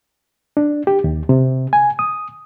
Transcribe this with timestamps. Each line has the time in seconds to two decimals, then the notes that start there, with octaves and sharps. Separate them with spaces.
0.57 D4
0.87 G4
1.04 D#2
1.29 C3
1.73 G#5
1.99 D#6